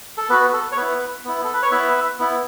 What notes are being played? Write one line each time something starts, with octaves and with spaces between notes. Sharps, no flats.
A4
B3 F#4 B4
A4
C#5
B3 E4 B4
B3 E4
A4
B4
C#5
B3 E4 B4 E5
B3 E4